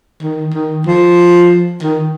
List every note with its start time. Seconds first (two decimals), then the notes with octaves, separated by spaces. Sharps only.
0.22 D#3
0.54 D#3
0.87 F3
1.83 D#3